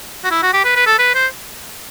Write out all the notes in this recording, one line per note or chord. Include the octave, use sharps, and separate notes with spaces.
F#4
E4
F#4
G4
B4
B4
A4
B4
C5